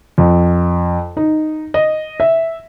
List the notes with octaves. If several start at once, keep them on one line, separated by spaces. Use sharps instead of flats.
F2
D#4
D#5
E5